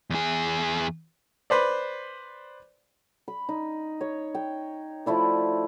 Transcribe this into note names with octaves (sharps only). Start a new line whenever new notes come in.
E2 G#4
B4 C5 D5
B5
D#4
C#5
G5
F3 A3 E4 D5